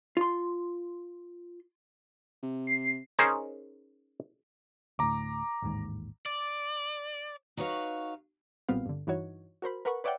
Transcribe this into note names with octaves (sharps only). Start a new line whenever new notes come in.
F4 C6
C3
C7
C#4 D#4 G#4 A#4 C5
D2 A2 A#5 D6
A1 D#2 G#2
D5
D#4 F#4 B4 C#5 F5
B1 A#2 G3 B3 C4 F5
G2 D3
G2 E3 D#4 F#4 C#5
F#4 A#4 C5 B5
A#4 B4 F#5 B5 C#6
B4 C#5 D5 E5 F#5 G5